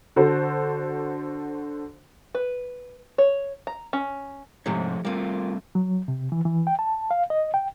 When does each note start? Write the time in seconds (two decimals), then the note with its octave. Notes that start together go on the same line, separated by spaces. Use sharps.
0.16 D3 F#4 A4 C5
2.35 B4
3.18 C#5
3.67 A#5
3.93 C#4
4.66 G#2 C3 F3 A3 C#5
5.05 G3 A3 A#3 C4 F4
5.75 F#3
6.08 C3
6.32 E3
6.45 E3
6.67 G5
6.79 A5
7.11 F5
7.30 D#5
7.54 G5